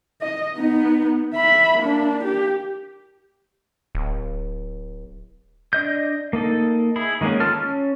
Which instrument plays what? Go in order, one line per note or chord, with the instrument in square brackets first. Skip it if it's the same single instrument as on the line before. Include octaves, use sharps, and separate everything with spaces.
[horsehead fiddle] D#5
B3 D#4
E5 B5
A#3 D4
G4
[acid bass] D1
[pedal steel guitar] D4 D#5 G6
A#3 D#4 A4
E4 G#4 B5
D#3 G#3 A#3 B3 C#4
F4 A4 A5 F6
C#4